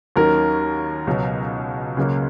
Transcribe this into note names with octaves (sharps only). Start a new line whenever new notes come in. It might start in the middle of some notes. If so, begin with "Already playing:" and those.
D#2 D#3 F#3 C#4 A#4
C#2 B2 F#3
C#2 C#3 F#3 A#3